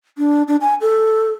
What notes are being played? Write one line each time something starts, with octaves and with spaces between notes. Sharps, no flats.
D4
D4
G#5
A4